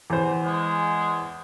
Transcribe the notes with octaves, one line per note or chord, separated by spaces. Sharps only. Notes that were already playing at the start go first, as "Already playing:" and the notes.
E2 C5
G#3